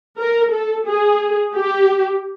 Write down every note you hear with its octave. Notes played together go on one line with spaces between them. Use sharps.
A#4
A4
G#4
G4